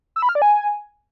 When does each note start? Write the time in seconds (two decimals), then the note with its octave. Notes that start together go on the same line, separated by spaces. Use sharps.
0.16 E6
0.22 B5
0.29 F6
0.35 D5
0.42 G#5